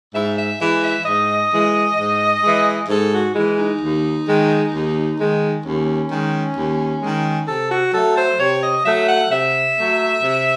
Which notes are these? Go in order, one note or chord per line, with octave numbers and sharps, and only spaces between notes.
G#2 E5
E5
E3 G#3 E5
E5
G#2 D#5
E3 G#3
G#2
E3 G#3
G#2 A4
F#4
E3 G#3 E4
D#4
D#2
D#3 G#3
D#2
D#3 G#3
D#2 C#4
D#3 G#3
D#2
D#3 G#3
C3 A4
F#4
F#3 A3 A4
C5
C3 C#5
D#5
F#3 A3 E5
F#5
C3 E5
F#3 A3
C3